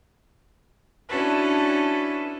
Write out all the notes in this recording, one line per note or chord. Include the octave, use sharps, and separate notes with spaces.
C#4 D4 E4 F#4 A4 B4